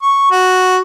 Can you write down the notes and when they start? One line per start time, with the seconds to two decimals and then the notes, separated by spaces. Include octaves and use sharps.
0.02 C#6
0.31 F#4